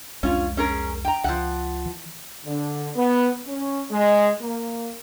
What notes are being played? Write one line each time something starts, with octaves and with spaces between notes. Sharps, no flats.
C2 F2 G#3 C#4 F4
C#4 G#4 A#4
G5 A#5
C#2 F3 F#5
E3
D3
B3
C#4
G#3
A#3